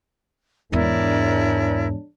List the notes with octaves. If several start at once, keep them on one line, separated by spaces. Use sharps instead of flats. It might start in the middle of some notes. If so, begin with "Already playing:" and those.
E2 G#2 G#3 D4 E4 A#4 C#5 D5